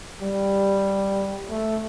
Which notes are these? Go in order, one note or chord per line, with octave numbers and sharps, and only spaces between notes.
G3
A3